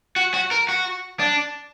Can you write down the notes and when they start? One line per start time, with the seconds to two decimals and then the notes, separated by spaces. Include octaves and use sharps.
0.16 F#4
0.34 F#4
0.51 A#4
0.69 F#4
1.20 D4